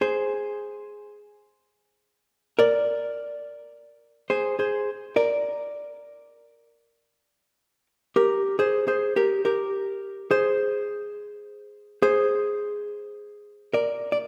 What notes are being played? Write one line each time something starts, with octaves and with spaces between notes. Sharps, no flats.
G#4 C5
A#4 D5
G#4 C5
G#4 C5
A#4 D5
G4 A#4
G#4 C5
G#4 C5
G4 A#4
G4 A#4
G#4 C5
G#4 C5
A#4 D5
D5